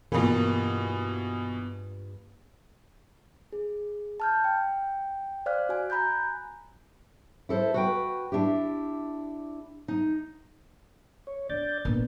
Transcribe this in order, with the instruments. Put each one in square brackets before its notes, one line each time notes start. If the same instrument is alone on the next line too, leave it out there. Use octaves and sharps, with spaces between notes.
[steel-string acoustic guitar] G2 F4 B4 [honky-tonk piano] B2 E3 [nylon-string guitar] A#3
[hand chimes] G#4
A5 F6 G6
G5
C5 D5 F5 F6 F#6
F#4 G#5
G#5 A#5 B5 F#6 G6
[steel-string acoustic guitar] E4 A4 B4 C5
F#4 B4 G5
D4 E4 G4
D#4
[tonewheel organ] C#5
[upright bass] D4 [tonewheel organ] D5 G6 A6
[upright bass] A#1 [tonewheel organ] A#2 A#3 B3